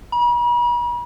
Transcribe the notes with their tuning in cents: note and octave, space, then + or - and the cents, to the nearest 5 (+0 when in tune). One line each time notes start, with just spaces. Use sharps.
B5 -45